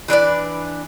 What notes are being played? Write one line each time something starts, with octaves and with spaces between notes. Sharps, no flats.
E3 D4 B4 D5